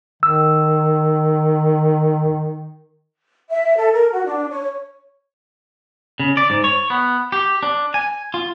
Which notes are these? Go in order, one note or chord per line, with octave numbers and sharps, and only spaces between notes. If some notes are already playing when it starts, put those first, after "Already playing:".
D#3 E6
E5
A4
A#4
F#4
D4
C#5
C#3
D5
G#2
C#5
B3
G4
D4
G#5
F4